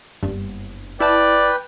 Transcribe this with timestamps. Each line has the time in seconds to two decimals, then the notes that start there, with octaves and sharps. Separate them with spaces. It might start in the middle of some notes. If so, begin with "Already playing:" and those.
0.23 F#1 G2 B3
1.00 E4 B4 D5 G5 A5